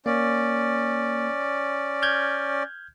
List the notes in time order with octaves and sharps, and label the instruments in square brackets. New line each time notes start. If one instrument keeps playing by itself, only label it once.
[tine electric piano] A#3 [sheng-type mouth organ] C#4 D5
[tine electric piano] F6 G6 G#6